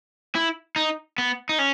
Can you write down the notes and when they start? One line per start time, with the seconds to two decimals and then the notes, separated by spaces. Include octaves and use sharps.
0.35 E4
0.76 D#4
1.18 B3
1.49 D#4
1.59 C#4